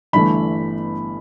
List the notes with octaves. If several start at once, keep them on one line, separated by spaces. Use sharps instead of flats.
G1 G2 E3 A3 B5